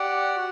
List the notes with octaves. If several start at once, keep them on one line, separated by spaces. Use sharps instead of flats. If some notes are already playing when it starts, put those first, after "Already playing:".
Already playing: G4 D5 F#5
F#4